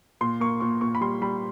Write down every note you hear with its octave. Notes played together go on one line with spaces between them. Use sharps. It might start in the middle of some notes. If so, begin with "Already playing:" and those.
A#2 C6
A#3 C#6
A#2 C#6
A#2 C#6
B5
G3 C6
G3 B5